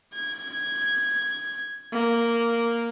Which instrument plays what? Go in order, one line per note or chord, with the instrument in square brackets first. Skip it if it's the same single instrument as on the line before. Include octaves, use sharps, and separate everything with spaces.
[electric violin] G#6
A#3